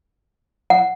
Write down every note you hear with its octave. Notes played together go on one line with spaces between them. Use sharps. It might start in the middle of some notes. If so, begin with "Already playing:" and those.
F#5